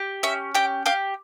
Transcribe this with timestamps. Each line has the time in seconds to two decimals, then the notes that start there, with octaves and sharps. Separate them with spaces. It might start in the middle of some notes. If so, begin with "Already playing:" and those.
Already playing: G4
0.23 C#4 E5
0.55 G4 G5
0.86 G4 F5